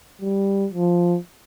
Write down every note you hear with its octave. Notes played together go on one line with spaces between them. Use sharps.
G3
F3